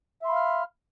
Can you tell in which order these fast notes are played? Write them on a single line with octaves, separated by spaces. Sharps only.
E5 C6 B5 F5 F6